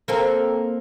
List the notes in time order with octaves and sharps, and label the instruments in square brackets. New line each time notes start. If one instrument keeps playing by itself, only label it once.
[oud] A#3 C4 A4